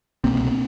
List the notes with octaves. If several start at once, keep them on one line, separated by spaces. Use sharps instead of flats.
C2 B2 A#3 C4